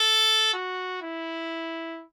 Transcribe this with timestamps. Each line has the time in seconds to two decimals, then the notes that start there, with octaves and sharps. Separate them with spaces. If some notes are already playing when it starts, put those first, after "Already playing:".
Already playing: A4
0.54 F#4
1.02 E4